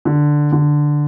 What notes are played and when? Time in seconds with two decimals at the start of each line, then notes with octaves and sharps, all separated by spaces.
0.05 D3
0.52 D3